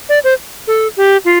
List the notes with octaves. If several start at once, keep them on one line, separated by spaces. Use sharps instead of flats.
D5
C5
A4
G4
F4